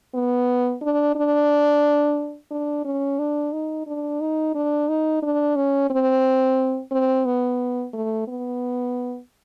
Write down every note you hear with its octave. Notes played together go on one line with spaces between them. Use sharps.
B3
D4
D4
D4
C#4
D4
D#4
D4
D#4
D4
D#4
D4
C#4
C4
C4
B3
A3
B3